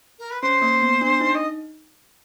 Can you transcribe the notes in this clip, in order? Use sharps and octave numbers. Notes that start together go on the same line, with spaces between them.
A#4
B4
C#4 C5
A#3
B3
D4
D#4
D#5